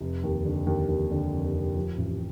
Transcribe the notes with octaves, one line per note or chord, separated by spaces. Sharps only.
F1
D#2
D3
D#2
D#2
D3
F1
F1
F3
A1